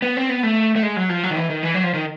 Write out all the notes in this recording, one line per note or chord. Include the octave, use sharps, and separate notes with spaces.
B3
C4
B3
A3
A3
G#3
F#3
F3
F#3
D#3
E3
D#3
E3
F#3
F3
D#3